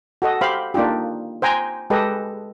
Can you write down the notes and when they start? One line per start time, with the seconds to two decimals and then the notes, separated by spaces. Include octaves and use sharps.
0.22 F#4 A4 D#5
0.41 G4 C5 F5 B5
0.74 A#3 D4 D#4 F4 G4
1.42 C5 G5 G#5 A#5
1.90 G#3 G4 A4 B4 D#5